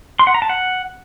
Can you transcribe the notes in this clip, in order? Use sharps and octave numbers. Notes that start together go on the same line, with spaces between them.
C6
F#5
A#5
A5
F#5